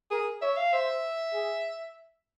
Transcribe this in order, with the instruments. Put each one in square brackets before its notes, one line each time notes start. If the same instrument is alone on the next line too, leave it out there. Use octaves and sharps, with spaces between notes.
[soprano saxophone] G#4 [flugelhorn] A#4
[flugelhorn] C#5 [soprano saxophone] E5
[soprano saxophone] F5
[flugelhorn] C5 [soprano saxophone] E5
[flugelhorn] G#4